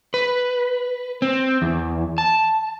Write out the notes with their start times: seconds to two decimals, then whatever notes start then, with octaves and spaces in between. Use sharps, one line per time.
0.14 B4
1.22 C4
1.62 E2
2.18 A5